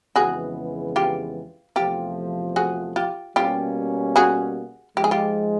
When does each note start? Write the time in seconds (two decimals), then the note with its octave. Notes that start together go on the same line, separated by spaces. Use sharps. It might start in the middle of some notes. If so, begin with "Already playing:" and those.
0.16 F2 C#3 E3 G#3 B3 F#4 G#4
0.96 F4 G4
1.76 E2 C3 F3 A3 F4 G4
2.56 F#4 G#4
2.96 F4 G4
3.36 B2 G3 A#3 C#4 F4 G4
4.16 F#4 G#4
4.96 G#2 F3 G#3 G4
5.04 G#4
5.11 F4 G4